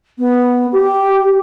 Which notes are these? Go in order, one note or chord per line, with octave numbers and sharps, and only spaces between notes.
B3
G4